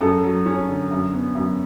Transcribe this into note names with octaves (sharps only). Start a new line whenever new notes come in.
F#2 A4
F#3
C#4
D3
F#2
B3
F#2